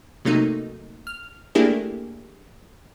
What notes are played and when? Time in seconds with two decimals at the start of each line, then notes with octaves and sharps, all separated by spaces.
0.25 C3 F#3 A3 A#3 D#4
1.07 F6
1.55 A3 A#3 D4 E4 G4 G#4